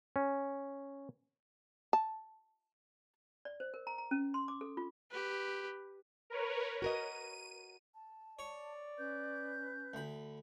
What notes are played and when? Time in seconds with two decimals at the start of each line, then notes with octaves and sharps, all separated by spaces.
0.16 C#4
1.93 A5
3.45 D5
3.60 C5
3.74 A#4
3.87 A#5
3.98 A#5
4.11 C#4
4.34 C6
4.48 D6
4.61 A4
4.77 F4
5.12 G4 B4
6.30 A#4 B4 C#5
6.82 F#4 A#4 D#5 D#7
7.95 A5
8.39 C#5 D5
8.98 C#4 B4 G6
9.94 D2 B5